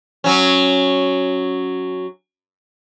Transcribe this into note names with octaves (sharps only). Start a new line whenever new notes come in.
F#3 C#4